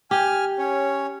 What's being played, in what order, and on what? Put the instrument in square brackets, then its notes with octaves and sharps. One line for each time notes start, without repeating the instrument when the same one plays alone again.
[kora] G4 [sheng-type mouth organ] G#5 F6
[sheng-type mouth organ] C#4 C#5